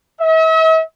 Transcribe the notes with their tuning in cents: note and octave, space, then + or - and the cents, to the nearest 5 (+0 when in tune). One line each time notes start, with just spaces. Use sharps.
E5 -45